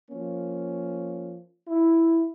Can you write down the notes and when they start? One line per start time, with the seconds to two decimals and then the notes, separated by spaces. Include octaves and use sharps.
0.11 F3 A#3 C#4
1.68 E4